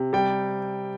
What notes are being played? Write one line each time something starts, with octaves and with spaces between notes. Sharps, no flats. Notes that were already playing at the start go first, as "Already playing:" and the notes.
Already playing: C3
G3 G5